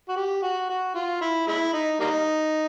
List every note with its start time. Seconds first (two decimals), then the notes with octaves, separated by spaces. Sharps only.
0.09 F#4
0.16 G4
0.43 F#4
0.69 F#4
0.95 F4
1.22 E4
1.47 G#3 E4
1.74 D#4
2.00 G3 A#3 D#4